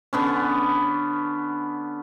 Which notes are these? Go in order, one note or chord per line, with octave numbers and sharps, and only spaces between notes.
D3 B3 C#4